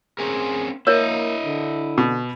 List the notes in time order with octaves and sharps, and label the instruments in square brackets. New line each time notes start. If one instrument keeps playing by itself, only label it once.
[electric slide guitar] C4 C#4 A#4 [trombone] G#4
[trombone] A#3 [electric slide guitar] E4 D#5 [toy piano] A#4 C#5 E5
[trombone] D3
[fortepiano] B2